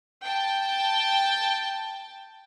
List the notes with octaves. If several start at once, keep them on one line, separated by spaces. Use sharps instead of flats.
G5 A5